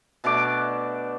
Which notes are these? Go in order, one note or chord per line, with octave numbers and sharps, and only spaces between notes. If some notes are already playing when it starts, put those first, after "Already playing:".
B2 A3 D4 D6